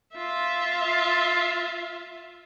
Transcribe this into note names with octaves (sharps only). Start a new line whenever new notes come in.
F4 E5